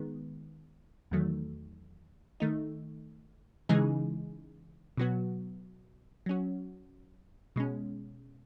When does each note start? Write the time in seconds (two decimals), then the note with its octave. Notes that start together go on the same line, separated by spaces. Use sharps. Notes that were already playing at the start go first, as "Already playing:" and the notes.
Already playing: D#3 G#3 B3
1.11 E2 D#3 F#3 A3
2.40 D#3 A3 D#4
3.69 C#3 E3 G#3 D#4 G#4
4.97 B2 F#3 B3 F#4
6.26 F#3 C#4 F#4
7.56 B2 G#3 C#4